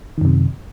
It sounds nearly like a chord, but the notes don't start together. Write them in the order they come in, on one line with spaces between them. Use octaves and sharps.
D#3 F#2 C3